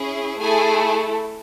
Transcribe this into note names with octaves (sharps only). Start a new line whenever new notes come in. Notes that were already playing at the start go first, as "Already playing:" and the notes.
Already playing: C#4 E4 G#4
A3 E4 G#4 A4 G#5